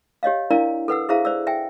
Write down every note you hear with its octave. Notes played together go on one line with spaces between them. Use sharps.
G4 C#5 D#5 F5
D4 E4 A#4 D5 F5 A#5
A4 B4 F#5 E6
E4 G#4 C5 E5 F5 A#5
C5 D5 E6
E5 G5 G#5